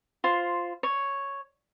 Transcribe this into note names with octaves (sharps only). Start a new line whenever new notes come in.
F4 C5
C#5